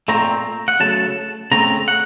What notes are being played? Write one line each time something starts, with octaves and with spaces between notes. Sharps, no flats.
A#2 A3 C4 A#5
F#5
C#3 F#3 A3 A5
C#3 A3 C4 A#5
F#5